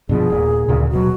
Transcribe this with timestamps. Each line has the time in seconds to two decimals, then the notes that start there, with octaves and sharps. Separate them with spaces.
0.09 G2 B2 F3 G#4
0.30 D#1 A#2
0.68 D2 A#2 C#3
0.91 D#1 B2 F#3 F#4